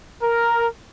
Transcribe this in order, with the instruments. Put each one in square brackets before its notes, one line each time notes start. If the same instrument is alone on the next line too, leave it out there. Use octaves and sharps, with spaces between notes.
[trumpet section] A#4